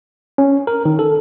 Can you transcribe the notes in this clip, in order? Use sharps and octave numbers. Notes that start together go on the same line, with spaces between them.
C#4
A#4
D#3
A4